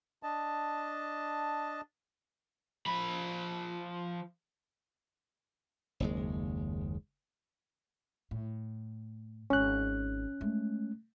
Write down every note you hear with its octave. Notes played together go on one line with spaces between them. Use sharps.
D4 D#5 A5
F3 B5
F#1 D#2 G#3
A2
G#1 C#4 F#6
G#3 A3